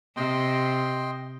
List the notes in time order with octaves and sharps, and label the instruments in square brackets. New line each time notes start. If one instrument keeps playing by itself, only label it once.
[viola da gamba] C3 [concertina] D#5 G5 C6